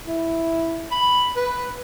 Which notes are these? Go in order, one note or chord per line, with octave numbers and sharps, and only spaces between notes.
E4
B5
B4